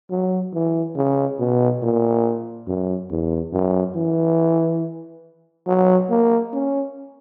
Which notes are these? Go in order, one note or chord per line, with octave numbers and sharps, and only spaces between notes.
F#3
E3
C#3
B2
A#2
F#2
E2
F#2
E3
F#3
A#3
C#4